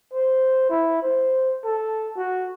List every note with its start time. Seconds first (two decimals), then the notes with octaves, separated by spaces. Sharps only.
0.13 C5
0.70 E4
1.02 C5
1.64 A4
2.16 F#4